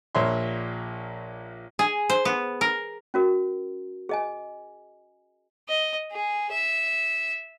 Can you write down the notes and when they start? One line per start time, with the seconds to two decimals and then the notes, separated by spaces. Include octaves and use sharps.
0.15 A#1 A#2 C#5 E5 C6
1.79 G#4
2.10 C5
2.25 B3
2.61 A#4
3.14 C#4 F#4 A#4
4.09 G#4 D#5 G#5
5.68 D#5
6.12 G#4
6.51 E5